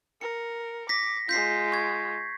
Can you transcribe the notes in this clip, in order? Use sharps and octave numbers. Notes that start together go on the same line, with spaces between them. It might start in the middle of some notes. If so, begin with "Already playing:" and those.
A#4 C#7
D6 A#6 B6
G#3 F4 G6 B6 C7
C#6 G#6